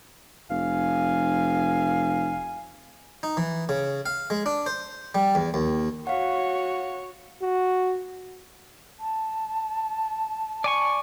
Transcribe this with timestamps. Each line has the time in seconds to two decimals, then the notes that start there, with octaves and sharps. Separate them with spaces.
0.50 F1 F5 G#5
3.23 D#4
3.37 E3
3.69 C#3
4.06 F5
4.30 G#3
4.46 D4
4.66 C5
5.15 G3
5.35 E2
5.54 D#2
6.07 F#4 C#5 F5 F#5
7.42 F#4
9.00 A5
10.64 D5 G#5 C#6